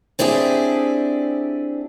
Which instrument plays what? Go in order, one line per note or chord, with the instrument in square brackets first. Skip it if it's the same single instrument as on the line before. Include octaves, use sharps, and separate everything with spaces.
[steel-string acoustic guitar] C4 D4 E4 G4 G#4